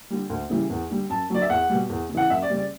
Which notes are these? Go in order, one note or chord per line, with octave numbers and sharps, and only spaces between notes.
D3 G3
D2
C#3 E3 G3
E2
D3 G3
F#2 A5
D3 F#3 D5
E5
E2 F#5
B2 G3
E2
C#3
E3 F#5
F#2 E5
D5
C#3 G3
D5